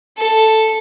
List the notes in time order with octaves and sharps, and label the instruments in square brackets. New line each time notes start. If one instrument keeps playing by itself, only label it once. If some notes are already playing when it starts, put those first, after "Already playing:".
[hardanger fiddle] A4